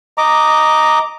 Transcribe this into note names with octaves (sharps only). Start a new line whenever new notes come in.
D#5 A#5 D6